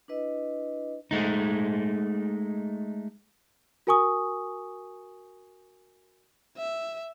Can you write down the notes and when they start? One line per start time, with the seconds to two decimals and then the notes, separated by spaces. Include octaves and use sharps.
0.08 D4 E4 B4 D#5
1.11 G#3 A3 D#4
3.87 F#4 A#4 G#5 C#6 D#6
6.57 E5